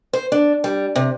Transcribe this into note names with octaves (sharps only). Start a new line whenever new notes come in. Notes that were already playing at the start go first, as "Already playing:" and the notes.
C5
D4
G3
C3